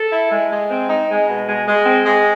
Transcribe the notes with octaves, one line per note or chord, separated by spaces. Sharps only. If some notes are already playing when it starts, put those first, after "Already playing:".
Already playing: A4
E4
G#3
G#3
C4
D#4
G#3
B2
G#3
G#3
C4
G#3